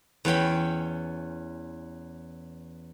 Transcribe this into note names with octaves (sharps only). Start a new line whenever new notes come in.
E2 C#4 G5 B5